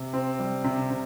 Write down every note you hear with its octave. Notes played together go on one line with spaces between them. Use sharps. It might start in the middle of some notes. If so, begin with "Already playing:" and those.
Already playing: C3
C4
G3
C3
C3